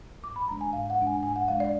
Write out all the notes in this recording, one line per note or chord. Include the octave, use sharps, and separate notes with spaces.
G#2 D6
B5
F3 G#3 D4 A#5
G#5
G#2 F5
F#5
F3 G#3 D4
G#5
G#2 G#5
F#5
F3 G#3 D4 F5
D5